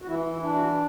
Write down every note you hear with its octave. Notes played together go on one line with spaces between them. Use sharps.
F#4
E3 E4
E4
D4
F#4